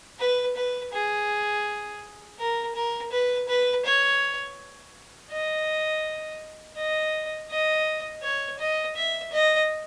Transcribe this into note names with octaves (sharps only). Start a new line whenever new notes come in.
B4
B4
G#4
A#4
A#4
B4
B4
C#5
D#5
D#5
D#5
C#5
D#5
E5
D#5